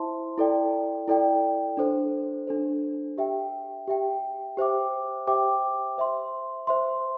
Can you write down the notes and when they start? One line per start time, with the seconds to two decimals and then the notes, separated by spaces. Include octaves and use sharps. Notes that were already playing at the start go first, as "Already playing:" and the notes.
Already playing: E4 C5 E5 A5 C6
0.38 E4 A4 D5 G5
1.08 E4 A4 D5 G5
1.77 D4 A4 C5
2.47 D4 A4 C5
3.18 G4 E5 G5
3.88 G4 E5 G5
4.57 G4 C5 E5 G5 D6
5.27 G4 C5 E5 G5 D6
5.98 C5 E5 C6
6.67 C5 E5 C6